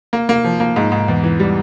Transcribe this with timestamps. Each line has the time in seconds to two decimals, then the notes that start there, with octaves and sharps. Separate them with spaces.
0.13 A#3
0.29 A#3
0.44 F3
0.60 A#3
0.76 G#2
0.92 G#2
1.08 E2
1.23 E3
1.39 G3